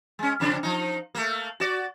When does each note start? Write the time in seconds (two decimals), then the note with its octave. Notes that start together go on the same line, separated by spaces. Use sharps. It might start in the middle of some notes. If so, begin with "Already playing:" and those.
0.19 G#3 C#4
0.40 F2 C#3 D4
0.63 F3 D#4
1.15 A3 A#3
1.60 F#4 D5